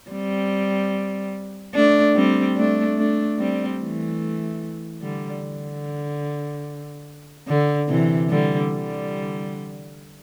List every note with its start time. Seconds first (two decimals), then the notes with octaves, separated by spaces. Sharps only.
0.11 G3 C4
1.74 A3 D4
2.15 G3 C4
2.56 A3 D4
2.97 A3 D4
3.38 G3 C4
3.79 E3 A3
5.02 D3 G3
5.43 D3
7.48 D3
7.88 C3 E3
8.29 D3 G3
8.70 D3 G3